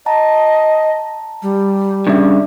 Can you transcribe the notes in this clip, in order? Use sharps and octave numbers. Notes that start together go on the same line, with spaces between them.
D#5 F#5 A5 A#5
G3
G2 C#3 D5 E5